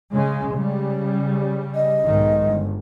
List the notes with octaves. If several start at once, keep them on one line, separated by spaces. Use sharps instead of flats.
C#3 G#3
C#3 G3
D#5
B1 G#2 D#3
G1